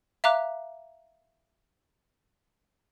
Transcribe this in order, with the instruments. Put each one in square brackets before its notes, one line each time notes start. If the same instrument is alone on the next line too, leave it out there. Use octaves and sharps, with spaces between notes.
[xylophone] E5 F5 A#5 D6 F#6